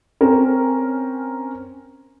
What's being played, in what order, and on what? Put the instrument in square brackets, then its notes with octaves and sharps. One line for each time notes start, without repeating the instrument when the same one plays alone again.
[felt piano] C4 C#4 A#4